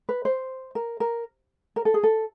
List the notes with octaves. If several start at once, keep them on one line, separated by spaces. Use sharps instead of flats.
B4
C5
A#4
A#4
A#4
A4
G#4
A4